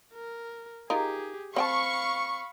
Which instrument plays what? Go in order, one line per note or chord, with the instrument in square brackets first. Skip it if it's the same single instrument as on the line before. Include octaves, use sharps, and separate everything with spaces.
[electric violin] A#4
[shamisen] D#4 F4 A#4 [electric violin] G4 G#4
[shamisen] C4 G5 A5 [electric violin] F5 B5 [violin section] C#6